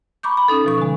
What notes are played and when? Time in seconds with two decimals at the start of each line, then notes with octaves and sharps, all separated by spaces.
0.23 A#5 B5 C#6 D6 G6
0.37 B5
0.48 C#4 D#4 A4
0.65 B2 F3 C#6
0.78 D3 G#3